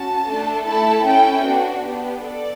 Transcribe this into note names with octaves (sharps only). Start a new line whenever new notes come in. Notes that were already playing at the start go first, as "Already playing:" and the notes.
Already playing: C#4 F#4 A5
A3 D4 A4
A3 E4 A4 A5
C#4 E4 A4 G5
B3 D4 F#4
B3 D4 G4
A4 D5